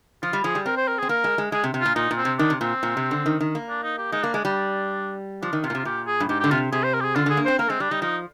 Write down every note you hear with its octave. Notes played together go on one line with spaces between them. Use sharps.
F3 F4
G3
F3 G#4
G3
C4 A#4
C5
A#4
G#4
C4
A#3 A#4
G#3
G#3
G#3 G#4
C3
C3
A#2 F4
A#2 D#4
A#2
C4
C3
D#3 D4
C3
A#2 C4
A#2
C3
D3
D#3
D#3
A#3
D4
D#4
G4
G#3 D#4
A#3 D4
G#3 D4
G3 D4
F3 D4
D#3
C3 F4
A#2
C3 F4
A#2 G4
G#4
G2
G#2 G4
G4
D3
C3 F4
C3 G#4
C5
A#4
G4
G#4
D3 F4
D3 G#4
A#3
C4 C5
A#3 A#4
G#3 C4
G3 D4
G3 D#4
F3 D#4